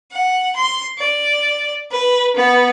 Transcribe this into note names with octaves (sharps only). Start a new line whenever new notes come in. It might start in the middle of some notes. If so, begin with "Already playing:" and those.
F#5
C6
D5
B4
B3